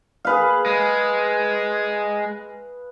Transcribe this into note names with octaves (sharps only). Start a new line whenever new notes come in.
G#4 B4 F5
G#3